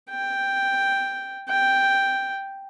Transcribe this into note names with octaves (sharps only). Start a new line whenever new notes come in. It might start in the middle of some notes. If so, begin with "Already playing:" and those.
G5
G5